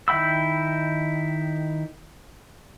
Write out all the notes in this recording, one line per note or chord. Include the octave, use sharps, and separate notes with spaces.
D#3 E4 G5 B5 E6